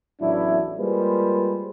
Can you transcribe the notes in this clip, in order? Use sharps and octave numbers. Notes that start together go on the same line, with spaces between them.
A1 E2 F#3 D4 E4
G3 G#3 A#3 F4 B4 C5